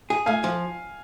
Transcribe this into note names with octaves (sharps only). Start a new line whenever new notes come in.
G#4
A3 F5 G#5
F3